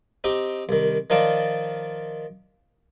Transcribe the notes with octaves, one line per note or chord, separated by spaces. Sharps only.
C4 D#4 G4
C2 D#3
D#3 F3 D#4 F4 D5 A5